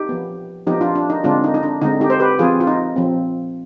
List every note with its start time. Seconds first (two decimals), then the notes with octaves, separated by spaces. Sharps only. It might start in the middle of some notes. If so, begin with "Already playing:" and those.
Already playing: D#4 G4
0.09 F3 B3
0.67 F3 B3 D#4 G4
0.81 D4 F4
0.95 D4
1.10 D#4
1.24 D3 G#3 C4 D4 F4
1.44 D#4
1.54 D#4
1.63 D4
1.82 D3 G#3 C4 D#4
2.01 D#4 G4
2.10 C5
2.20 G4 B4
2.39 F3 C4 F4 G#4
2.60 F4
2.67 D#4
2.96 F3 C4